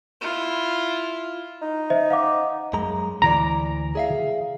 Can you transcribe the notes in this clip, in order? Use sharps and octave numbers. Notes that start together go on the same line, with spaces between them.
E4 F4
D#4
C5 D#5 E5
F5 F#5 D6
F#2 G#3 A#5
D2 E3 D5 A#5
G#4 E5 F5